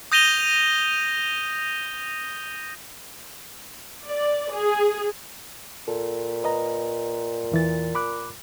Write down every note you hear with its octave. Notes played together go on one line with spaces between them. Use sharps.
D#6 G6 A#6 D#7 F7 G7
D5
G#4
A#2 A4
B4 D#5 A#5
E2 E3 A6
B5 D6 F#6